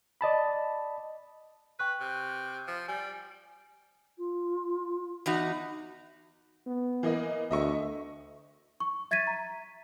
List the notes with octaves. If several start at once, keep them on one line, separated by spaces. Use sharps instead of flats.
D5 D#5 A5 B5
B4 G5 C#6 F#6
C3
F3
G3 G#5
F4
E2 D#4 F#4
B3
E3 A#3 D#5
D2 D#5 E5 C#6
C#6
E5 G#6 A6 B6 D#7
A#5